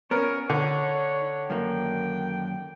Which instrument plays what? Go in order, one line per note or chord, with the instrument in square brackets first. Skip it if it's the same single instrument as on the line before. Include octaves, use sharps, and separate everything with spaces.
[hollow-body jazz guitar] B3 C#4 [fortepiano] A#4 [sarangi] C#5
[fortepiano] D3 [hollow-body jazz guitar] D#4 [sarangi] C#5
[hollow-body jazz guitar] F#2 D#3 A#3 [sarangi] G5